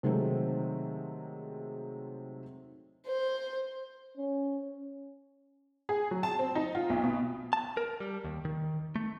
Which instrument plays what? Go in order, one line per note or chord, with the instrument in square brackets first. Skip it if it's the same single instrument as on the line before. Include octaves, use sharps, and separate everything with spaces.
[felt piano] C3 D#3 F#3 G#3 A3 C4
[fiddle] C5
[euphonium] C#4
[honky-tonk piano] G#4
F#3
A5
C4
D#4
F4
B1
B2
[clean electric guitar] A5
A#4
G3
D#2
D#3
A3